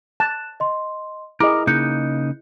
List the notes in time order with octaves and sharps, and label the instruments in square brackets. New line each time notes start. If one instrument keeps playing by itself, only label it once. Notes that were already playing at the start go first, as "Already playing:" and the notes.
[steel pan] A5 [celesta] F#6 E7
[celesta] D#5 C6
[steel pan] E4 G#4 D#5 [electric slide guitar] A#4 [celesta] D6
[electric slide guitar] C#3 A#3 D#4 [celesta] F#6 G6 C#7